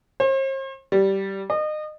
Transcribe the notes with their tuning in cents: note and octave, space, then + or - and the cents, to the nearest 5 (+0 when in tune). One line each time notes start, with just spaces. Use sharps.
C5 +45
G3 -15
D#5 -30